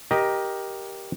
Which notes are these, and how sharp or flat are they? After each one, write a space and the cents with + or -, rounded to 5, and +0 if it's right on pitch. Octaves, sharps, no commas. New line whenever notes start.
G4 +0 A#4 +15 D#5 +0